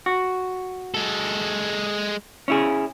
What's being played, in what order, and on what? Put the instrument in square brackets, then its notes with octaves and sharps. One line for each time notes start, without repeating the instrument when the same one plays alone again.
[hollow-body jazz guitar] F#4
[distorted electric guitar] G#3 A4
[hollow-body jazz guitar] C#4 E4 G#4